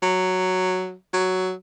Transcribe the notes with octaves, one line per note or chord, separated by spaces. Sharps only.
F#3
F#3